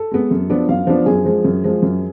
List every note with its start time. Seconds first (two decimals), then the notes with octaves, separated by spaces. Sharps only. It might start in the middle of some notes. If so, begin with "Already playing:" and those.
Already playing: A4
0.11 G#3 B3
0.31 F#2
0.50 F3 B3 D4
0.69 F#2 F5
0.87 F3 B3 D4
1.06 F#2 G#4
1.25 F3 G#3
1.45 F#2
1.64 F3 G#3
1.82 F#2